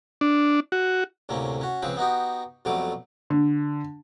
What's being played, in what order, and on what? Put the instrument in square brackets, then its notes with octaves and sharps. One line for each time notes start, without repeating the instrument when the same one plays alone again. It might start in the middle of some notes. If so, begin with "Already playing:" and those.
[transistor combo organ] D4
F#4
[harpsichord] D2 A2 C3 A#3 C#4
C#4 F#4
C#2 C#3 F3 C4 B4
B3 D#4 F#4 G4
F2 B2 F#3 G3 A3 D6
[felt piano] D3